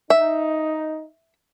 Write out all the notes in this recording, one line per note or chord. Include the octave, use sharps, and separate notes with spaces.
D#4 E5